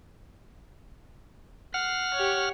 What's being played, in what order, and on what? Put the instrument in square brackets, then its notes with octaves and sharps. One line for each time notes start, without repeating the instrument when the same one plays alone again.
[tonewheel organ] F#5 F6 [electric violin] C7
[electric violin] G4 C#5